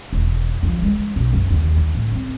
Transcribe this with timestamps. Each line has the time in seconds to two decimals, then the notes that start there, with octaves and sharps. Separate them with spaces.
0.13 E1
0.63 F3
0.82 G#3
1.16 B1
1.33 F#1
1.50 D#2
1.76 D3
1.95 A2
2.12 C4